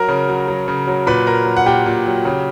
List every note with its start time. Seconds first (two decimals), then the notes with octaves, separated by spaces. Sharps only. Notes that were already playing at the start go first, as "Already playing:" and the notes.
Already playing: F#3 A#4 A#5
0.08 C#3
0.29 F#3
0.48 F#3
0.68 C#3
0.87 F#3
1.07 A#2 B4 B5
1.27 A#2 A#4 A#5
1.46 F#3
1.57 F#5
1.66 A#2 G4 G5
1.86 A#2
2.06 F#3
2.25 C#3